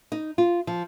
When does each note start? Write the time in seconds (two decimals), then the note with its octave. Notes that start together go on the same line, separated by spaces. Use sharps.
0.12 D#4
0.38 F4
0.67 F3